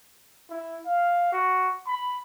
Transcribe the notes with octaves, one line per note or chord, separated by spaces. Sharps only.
E4
F5
F#4
B5